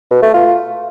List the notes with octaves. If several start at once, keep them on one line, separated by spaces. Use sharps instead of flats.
B2
A3
F4